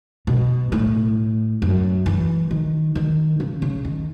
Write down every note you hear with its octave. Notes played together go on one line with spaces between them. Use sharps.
B2
A2
F#2
E3
D#3
D#3
C#3
C#3
D#3